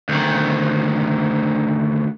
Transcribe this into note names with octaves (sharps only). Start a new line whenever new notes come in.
D2 D#3